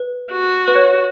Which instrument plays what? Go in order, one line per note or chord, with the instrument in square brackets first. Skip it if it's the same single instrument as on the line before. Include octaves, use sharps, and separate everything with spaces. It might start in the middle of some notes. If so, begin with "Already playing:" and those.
Already playing: [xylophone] B4
[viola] F#4
[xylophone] B4
C#5